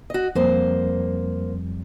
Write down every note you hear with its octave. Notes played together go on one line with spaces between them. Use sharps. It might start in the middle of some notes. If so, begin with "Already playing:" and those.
F#4 D#5
F2 F3 G3 A#3 C5